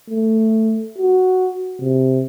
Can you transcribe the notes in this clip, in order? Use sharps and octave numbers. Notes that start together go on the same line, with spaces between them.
A3
F#4
C3